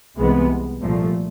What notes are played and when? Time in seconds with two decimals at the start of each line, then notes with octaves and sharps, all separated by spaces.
0.18 C2 C3 E3 G#3 B3
0.81 C2 A#2 F3 A3